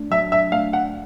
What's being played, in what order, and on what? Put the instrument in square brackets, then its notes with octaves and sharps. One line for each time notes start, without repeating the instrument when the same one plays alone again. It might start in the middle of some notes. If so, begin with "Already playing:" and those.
Already playing: [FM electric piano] A3 D4
[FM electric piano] F#3 [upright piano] E5
[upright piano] E5
[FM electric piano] A3 D4 [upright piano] F5
[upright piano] F#5